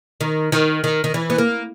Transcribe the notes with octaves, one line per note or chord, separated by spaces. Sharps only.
D#3
D#3
D#3
D#3
E3
B3
A#3